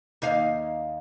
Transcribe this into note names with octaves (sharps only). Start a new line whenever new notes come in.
D#2 D#4 F5